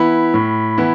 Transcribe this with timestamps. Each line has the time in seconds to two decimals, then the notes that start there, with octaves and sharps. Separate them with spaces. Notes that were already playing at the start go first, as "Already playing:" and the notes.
Already playing: E3 B3 E4 B5
0.34 A2
0.78 E3 B3 E4